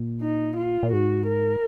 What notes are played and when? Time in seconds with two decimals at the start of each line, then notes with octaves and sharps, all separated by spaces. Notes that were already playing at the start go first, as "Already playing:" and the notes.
Already playing: A#2
0.21 D#4
0.57 F4
0.83 A#2
0.92 G#2 F#4
1.28 A#4